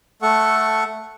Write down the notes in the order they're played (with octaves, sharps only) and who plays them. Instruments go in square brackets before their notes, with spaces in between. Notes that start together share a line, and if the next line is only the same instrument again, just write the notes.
[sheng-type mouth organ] A3 A4 F#5 C#6